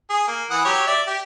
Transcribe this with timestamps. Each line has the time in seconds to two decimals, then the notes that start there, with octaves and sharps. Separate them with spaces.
0.10 G#4
0.28 A#3
0.51 E3 F#5 D#6
0.65 F#3 G4 C#5
0.87 D5 E5
1.07 G4